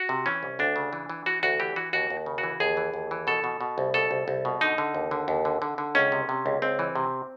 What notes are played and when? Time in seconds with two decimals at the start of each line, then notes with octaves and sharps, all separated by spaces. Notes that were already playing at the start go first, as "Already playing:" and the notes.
Already playing: F#4
0.09 C3
0.26 E3 C#4
0.43 C2
0.59 D2 D4
0.76 C#3
0.93 E3
1.10 E3
1.26 E3 F#4
1.43 D2 F#4
1.60 E3 G4
1.76 E3 F#4
1.93 D#2 F#4
2.10 D#2
2.26 C#3
2.38 F#4
2.43 E3
2.60 D#2 G#4
2.77 E3
2.94 D#2
3.11 E3
3.27 B2 A4
3.44 B2
3.61 B2
3.78 C2
3.94 B2 A4
4.11 C2
4.28 C2
4.45 B2
4.61 D3 D#4
4.78 D3
4.95 D#2
5.11 D3
5.28 D#2
5.45 D3
5.62 D3
5.78 D3
5.95 C#2 C#4
6.12 C3
6.29 C3
6.46 C#2
6.62 C#2 C4
6.79 E3
6.95 C3